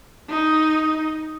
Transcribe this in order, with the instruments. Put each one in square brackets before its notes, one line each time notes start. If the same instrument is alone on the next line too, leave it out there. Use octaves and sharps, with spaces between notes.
[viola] D#4